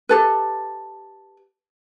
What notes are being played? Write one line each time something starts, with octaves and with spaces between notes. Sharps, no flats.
G4 A4 B4